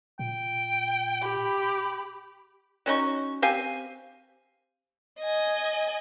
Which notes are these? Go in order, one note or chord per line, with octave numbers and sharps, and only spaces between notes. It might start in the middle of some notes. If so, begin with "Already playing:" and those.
A#2 G5
G4 B5
F#3 C#4 D#4 C#6
C4 G4 F5 G#5
D#5 G#5